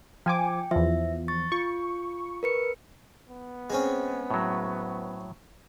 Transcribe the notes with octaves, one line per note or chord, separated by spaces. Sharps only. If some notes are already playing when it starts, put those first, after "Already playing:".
F3 G5 G#5 D6
E2 F3 E5
C#6 A6
F4 C#6
A#4 B4 C#7
B3
G#3 C4 C#4
A2 F#3